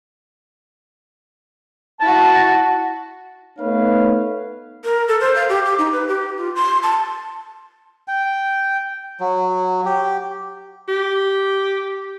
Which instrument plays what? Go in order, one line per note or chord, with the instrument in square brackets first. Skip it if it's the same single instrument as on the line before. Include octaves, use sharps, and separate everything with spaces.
[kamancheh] E4 F#4 [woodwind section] A5
[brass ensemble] A3 B3 D#4 B4 C#5 F5
[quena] A#4
A4
C5
F5
G4
D6
D#4
B4
G4
F4
C6
A5
[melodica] G5
F#3
G4
[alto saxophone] G4